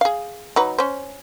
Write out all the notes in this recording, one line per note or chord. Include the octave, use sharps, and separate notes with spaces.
G#4 F5
F#3 D#4 B4
C#4 C5